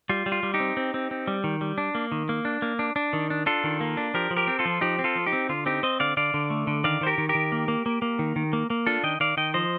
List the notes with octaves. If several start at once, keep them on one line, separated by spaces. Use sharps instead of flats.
G3 F4
G3
F4
G3
D#4 G4
C4
C4
C4
C4
G3
D#3
G3
D4
A#3
D#3
A#3
D4
A#3
D4
D4
D#3
D4
D4 F4 A4
D#3
A#3
D4
F3 G4 A#4
F3
G4 A#4
C4
F4 A4
F3
F3 D#4 G4
C4
F4 A4
F3
D#4 G4
C4
D3 F4
C4 D#4 G4
C4 C5 D#5
D3 D5 F5
D3 D5 F5
D3
A3
D3
D#3 D5 F5
D#3 C5
G4 A#4
D#3
G4 A#4
D#3
A#3
A#3
A#3
A#3
D#3
D#3
A#3
A#3
D4 F4 A4
D#3 D#5 G5
D#3 D5 F5
D#3 D#5 G5
F3 C5 D#5